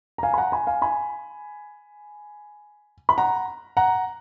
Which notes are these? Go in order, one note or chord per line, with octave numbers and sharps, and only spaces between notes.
A#5
F5 G#5
B5
F#5 A#5
G#5 B5
F5 G#5
G#5 B5
B5
F#5 A#5
F#5 A#5